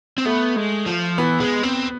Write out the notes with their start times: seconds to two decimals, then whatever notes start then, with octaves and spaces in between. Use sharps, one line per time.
0.18 C4
0.25 A3 B3
0.57 G#3
0.86 F3
1.18 E3 B3
1.40 G#3
1.63 C4